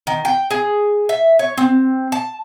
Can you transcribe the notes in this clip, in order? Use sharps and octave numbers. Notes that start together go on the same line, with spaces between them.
D#3
G5
G#4
E5
C#5
C4
A5